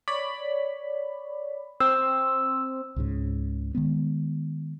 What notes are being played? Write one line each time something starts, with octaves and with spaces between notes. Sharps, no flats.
C#5 D5 B5
C4 C5 E6
C#2 G#2 C#3
D#3 G#3 B3